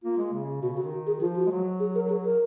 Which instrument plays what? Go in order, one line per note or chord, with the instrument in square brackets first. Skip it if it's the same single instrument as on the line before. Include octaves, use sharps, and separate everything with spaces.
[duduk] A#3 [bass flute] F4
[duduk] G#3
C#3
[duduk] B2 [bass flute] F#4
[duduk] C#3
[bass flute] F#4
[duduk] D#3
[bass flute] G#4
[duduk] F3 [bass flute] F4
[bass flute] F#4
[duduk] G#3
F#3
[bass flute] G#4
A#4
G#4
A#4